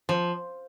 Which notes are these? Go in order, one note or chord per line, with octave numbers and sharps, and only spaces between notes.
F3